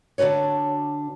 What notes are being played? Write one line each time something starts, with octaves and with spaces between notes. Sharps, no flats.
D3 D4 F#4 B4 C#5